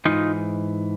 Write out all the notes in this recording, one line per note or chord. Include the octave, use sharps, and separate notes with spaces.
G#2 E3 D#4 F4